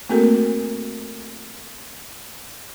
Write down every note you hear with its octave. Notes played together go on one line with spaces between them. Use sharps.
A3 A#3 C4 F#4 A4 A#4